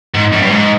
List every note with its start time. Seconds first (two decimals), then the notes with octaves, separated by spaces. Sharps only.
0.14 G#2
0.32 F#2
0.41 G2
0.51 G#2